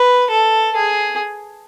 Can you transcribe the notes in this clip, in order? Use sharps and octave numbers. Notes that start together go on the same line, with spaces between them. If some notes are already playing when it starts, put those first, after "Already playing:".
Already playing: B4
A4
G#4